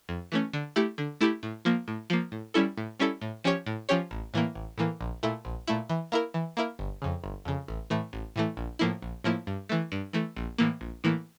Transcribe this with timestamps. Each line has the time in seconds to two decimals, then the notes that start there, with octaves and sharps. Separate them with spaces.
0.09 F2
0.32 E3 A3 C#4
0.53 D3
0.76 A3 E4 G4
0.98 D3
1.21 A3 E4 G4
1.43 A2
1.65 F3 A#3
1.88 A2
2.10 F3 A#3
2.32 A2
2.54 G3 C#4 E4 A4
2.78 A2
3.00 G3 C#4 E4 A4
3.21 A2
3.44 F3 C#4 G4 C#5
3.66 A2
3.89 F3 C#4 G4 C#5
4.11 A1
4.34 A2 E3 A#3
4.55 A1
4.78 A2 E3 A#3
5.01 A#1
5.23 A#2 A3 E4
5.45 A#1
5.67 A#2 A3 E4
5.89 E3
6.12 A#3 E4 A#4
6.34 E3
6.57 A#3 E4 A#4
6.79 G1
7.02 F2 C#3
7.24 G1
7.45 F2 C#3
7.68 A1
7.90 A2 E3 A3
8.13 A1
8.36 A2 E3 A3
8.57 A#1
8.79 A2 F3 A#3 E4
9.02 A#1
9.24 A2 F3 A#3 E4
9.47 G2
9.69 E3 A3
9.92 G2
10.13 E3 A3
10.37 A#1
10.58 A2 E3 A#3
10.81 A#1
11.04 A2 E3 A#3